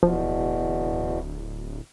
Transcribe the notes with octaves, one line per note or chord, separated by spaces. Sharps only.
D1 E2 B2 F3